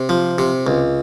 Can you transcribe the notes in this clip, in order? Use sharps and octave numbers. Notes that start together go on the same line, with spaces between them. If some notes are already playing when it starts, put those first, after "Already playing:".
Already playing: C3
F3
C3
C#2